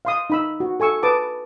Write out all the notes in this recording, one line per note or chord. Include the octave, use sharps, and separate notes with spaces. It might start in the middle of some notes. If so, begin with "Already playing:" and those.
F5 C6 D#6
D#4 B5 E6
F#4
A4 G#5 C#6 E6
B4 A5 D6 D#6